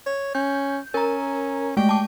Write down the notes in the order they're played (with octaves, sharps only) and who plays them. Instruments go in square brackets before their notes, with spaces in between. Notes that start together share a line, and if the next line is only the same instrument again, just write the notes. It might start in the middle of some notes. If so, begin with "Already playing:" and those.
[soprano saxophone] C#5
[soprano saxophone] C#4 [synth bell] G6
[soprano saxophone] C#4 [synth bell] A#4 A#5
[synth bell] G#3 A3 [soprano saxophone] G5
[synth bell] A5 D6